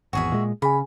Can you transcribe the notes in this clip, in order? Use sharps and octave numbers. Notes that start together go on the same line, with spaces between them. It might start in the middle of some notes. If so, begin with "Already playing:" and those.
G#1 E2 F#4 G#4 E5
A#2 G#3
C#3 G#4 G#5 B5